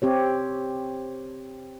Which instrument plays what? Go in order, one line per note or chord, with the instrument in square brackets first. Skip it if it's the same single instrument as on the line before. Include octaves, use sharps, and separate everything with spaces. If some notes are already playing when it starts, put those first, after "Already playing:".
[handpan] C4 G4 C#5